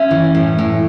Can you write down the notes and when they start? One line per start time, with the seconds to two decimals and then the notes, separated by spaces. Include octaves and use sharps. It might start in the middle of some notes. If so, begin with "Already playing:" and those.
Already playing: C#4 E5
0.11 E3
0.35 A2
0.59 A2